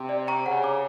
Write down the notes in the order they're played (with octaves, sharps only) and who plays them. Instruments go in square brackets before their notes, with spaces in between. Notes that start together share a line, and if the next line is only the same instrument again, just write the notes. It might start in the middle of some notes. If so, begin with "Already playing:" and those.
Already playing: [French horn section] C3
[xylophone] D5
G5 A#5 C#6
[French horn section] C#3 [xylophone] F#5
[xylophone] A#5 D6